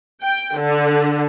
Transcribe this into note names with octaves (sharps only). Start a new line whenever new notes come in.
G5
D3